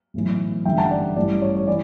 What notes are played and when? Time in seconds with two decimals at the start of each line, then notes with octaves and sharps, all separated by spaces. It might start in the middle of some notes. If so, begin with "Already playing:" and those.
0.14 B1 A2 E3
0.65 A1 G2 D3 E5 G5
0.78 F#5 A5
0.91 D5
1.16 A1 G2 E3 D5
1.42 C#5
1.56 C#5
1.67 E3 D5